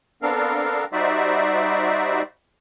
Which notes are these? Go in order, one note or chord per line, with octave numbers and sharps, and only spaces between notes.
B3 C4 D4 A4 A#4 F5
G3 D#4 F#4 C5 D5 E5